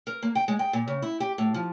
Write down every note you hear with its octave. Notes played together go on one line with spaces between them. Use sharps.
A#4
A#3
G5
G#3
G5
A#2
C#3
E4
G4
A2
F3